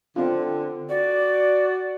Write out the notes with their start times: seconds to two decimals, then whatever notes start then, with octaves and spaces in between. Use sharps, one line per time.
0.16 D3 C4 F4
0.89 F#4 D5